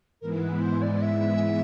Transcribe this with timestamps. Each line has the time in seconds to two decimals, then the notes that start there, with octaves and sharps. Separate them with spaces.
0.21 G#2 E3 G#3 B3 E4 A#4
0.41 B4
0.61 C5
0.82 D5
1.01 E5